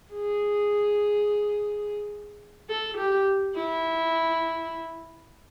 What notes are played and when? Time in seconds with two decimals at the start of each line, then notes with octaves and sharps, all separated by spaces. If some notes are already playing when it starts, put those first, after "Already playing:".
0.13 G#4
2.70 A4
2.97 G4
3.55 E4